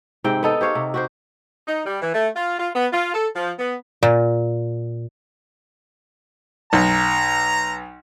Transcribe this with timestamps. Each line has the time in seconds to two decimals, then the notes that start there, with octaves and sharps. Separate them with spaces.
0.24 G#2 C3 C4 G5
0.43 B3 D#4 A4
0.61 G4 C5 C#5 F5
0.75 C3
0.94 F#4 G4 C5
1.67 D#4
1.85 G3
2.01 E3
2.14 A3
2.35 F4
2.58 F4
2.74 B3
2.92 F4
3.13 A4
3.35 F3
3.59 B3
4.03 A#2
6.73 B1 A#5